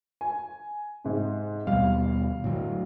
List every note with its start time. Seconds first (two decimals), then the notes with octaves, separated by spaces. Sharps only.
0.21 G#5
1.05 G#2 C3
1.67 D#2 B2 G3 F5
2.44 A2 D3 F#3